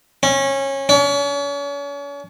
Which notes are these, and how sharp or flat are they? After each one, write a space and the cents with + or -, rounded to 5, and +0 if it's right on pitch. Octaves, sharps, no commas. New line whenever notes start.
C#4 -20
C#4 +40